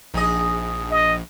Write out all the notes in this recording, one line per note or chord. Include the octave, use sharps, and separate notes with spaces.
A#1 D#4 G#4 D#5
D#5